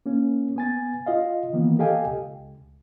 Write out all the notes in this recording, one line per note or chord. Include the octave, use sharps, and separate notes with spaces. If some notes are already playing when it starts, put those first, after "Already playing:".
A#3 C#4
B3 G#5 A6
F4 D#5 F5
D#3 E3 A#3 B3
G4 A4 D#5 F5 G5 G#5
C#2